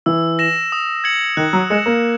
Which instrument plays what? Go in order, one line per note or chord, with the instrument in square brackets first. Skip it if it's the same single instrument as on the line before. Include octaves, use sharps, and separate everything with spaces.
[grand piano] E3 [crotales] E6
[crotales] A#6 E7
D#6
G#6 C#7 F#7
[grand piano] D#3 [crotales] F#6
[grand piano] F#3
[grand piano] G#3 [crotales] A#6 C#7 E7
[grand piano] A#3